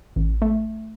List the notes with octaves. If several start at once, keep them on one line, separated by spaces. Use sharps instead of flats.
A1
A3